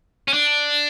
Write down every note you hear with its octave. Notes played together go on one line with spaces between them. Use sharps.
C#4
D4